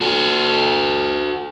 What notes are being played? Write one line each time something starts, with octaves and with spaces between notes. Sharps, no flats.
F#4 A4